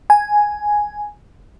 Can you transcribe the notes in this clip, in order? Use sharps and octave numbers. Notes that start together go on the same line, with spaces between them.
G#5